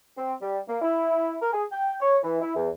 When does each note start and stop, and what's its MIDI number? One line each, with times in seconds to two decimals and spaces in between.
0.17 0.34 60
0.41 0.59 55
0.68 0.81 58
0.82 1.36 64
1.42 1.51 70
1.53 1.65 68
1.72 1.96 79
2.01 2.17 73
2.23 2.40 52
2.41 2.53 64
2.56 2.69 40